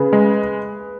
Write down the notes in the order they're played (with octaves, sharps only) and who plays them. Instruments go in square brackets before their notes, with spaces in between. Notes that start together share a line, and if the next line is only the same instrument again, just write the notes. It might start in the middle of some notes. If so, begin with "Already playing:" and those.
Already playing: [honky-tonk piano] C#3 [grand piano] G#4 B4
[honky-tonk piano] G#3